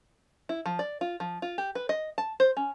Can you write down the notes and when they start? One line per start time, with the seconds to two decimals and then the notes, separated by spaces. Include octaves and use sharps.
0.49 E4
0.66 F3
0.79 D5
1.01 F4
1.20 F3
1.42 F4
1.58 G4
1.75 B4
1.89 D#5
2.18 A5
2.40 C5
2.57 C#4